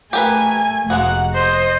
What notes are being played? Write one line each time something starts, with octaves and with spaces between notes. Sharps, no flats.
A3 G4 A#4 B4 G#5
F1 G#3 A#3 F#4 F#5
C5 D#5